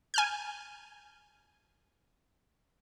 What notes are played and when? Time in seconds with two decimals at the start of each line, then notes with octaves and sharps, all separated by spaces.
0.14 G#5 F6 G6